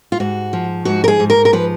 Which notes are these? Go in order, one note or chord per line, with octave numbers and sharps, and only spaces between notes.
F4
G#2 F#4
F3
G#2 F#4
A#4
G#4
G#2
A#4
A#4
F3 B4